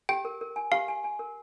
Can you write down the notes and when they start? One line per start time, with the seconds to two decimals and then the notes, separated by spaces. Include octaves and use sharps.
0.09 G4 G5
0.25 A#4
0.41 A#4
0.56 G#5
0.72 G4 F5
0.88 G#5
1.04 G#5
1.19 A#4